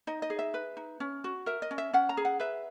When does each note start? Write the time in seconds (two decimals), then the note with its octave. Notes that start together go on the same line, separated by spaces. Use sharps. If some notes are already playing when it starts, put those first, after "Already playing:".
0.07 D#4 D#5
0.22 D#5
0.30 G#4
0.39 E5
0.54 B4
0.77 D#4
1.00 C#4
1.24 F#4
1.46 A#4 E5
1.62 D#5
1.71 C#4
1.78 E5
1.93 C#4 F#5
2.09 A#5
2.17 G#4
2.25 F#5
2.40 B4 E5